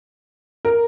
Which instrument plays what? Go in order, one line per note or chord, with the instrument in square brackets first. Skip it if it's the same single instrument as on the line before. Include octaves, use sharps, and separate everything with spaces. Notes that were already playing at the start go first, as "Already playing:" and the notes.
[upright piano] A#4